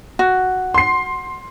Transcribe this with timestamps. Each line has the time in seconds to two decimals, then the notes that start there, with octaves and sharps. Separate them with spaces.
0.19 F#4
0.74 C6 C7